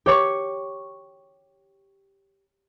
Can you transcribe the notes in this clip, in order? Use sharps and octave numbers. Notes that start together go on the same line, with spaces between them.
G4 C#5 C#6